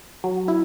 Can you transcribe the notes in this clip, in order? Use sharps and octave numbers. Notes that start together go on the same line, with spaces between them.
F#3
E4